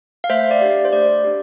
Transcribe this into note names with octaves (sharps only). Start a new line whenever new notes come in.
F5
A3 C5 E5
D5
D4 G4
C5
A3 D5
D4 G4